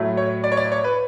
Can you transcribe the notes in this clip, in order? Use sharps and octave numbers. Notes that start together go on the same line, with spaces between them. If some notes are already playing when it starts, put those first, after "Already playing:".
Already playing: A2 F#3 A3
C#5
D5
C#5
D5
C#5
B4